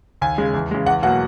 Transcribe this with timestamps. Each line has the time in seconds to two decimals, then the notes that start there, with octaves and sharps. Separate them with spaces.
0.21 D#2 G#5
0.38 C#3 G#3
0.54 E2
0.71 C#3 G#3
0.86 E2 F#5
1.03 B2 F#3 A#3 F#5